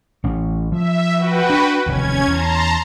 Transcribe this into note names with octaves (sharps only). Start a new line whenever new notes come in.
A1 C#4
F3 E5
F#4 B4 G5
D4
F1 D#2 C#4 G#6
E2 A5 A#5 C6